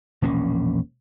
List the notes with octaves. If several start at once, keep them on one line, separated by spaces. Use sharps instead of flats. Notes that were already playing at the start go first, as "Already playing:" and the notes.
E1 A#1 A#3 C#4